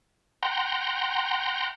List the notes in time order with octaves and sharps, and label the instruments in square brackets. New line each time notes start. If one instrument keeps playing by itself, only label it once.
[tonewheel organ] F#5 G5 A#5 C6